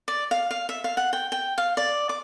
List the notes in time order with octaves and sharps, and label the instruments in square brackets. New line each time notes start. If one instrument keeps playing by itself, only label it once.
[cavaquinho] D5
F5
F5
E5
F5
F#5
G5
G5
F5
D5
D6